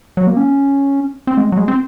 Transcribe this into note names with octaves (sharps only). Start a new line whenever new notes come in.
F#3
A#3
C#4
C4
G#3
F#3
G#3
C4